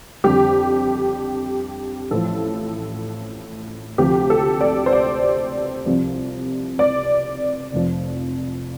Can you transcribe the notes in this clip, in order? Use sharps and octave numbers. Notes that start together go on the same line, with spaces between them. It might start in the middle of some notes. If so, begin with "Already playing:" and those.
F2 D3 G3 G4
A1 A2 F3 A4
D2 C3 F3 G4
A4
D5
C5
D5
C2 C3 F3
D5
F1 F2 F3